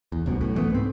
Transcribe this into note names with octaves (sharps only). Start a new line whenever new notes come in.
E2
F1 C2 F#2 B2
F#2 A2
C2 E3 A3 B3
G#2 C4